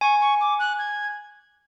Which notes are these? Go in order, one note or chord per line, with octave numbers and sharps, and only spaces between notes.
G#5 C#6
C#6
D6
F#6
G#6